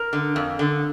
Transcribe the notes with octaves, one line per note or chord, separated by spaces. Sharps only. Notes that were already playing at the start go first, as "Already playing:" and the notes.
Already playing: A#4
D3
F2
D3